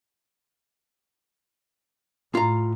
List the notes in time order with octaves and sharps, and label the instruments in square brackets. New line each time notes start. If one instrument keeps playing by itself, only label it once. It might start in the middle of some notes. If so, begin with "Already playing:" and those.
[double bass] A2 [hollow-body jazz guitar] F4 A#5